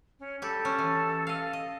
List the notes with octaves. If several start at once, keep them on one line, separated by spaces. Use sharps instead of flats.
C#4
G3 G4 A4
C#4
E3
D#5 F5
D#5